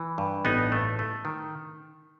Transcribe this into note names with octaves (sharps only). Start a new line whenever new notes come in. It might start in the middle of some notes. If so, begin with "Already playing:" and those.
Already playing: E3
G2
A1 B3 D#4
A3
A3
D#3